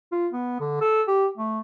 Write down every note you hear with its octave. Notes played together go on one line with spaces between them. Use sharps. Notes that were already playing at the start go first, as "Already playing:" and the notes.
F4
B3
D3
A4
G4
A3